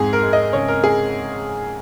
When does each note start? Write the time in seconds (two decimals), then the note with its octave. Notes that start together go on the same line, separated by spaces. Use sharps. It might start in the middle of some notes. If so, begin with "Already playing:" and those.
Already playing: F2 G#2 G#4
0.13 A#4
0.23 G#3
0.33 D#5
0.53 C#3 C#5
0.68 A#4
0.84 G#4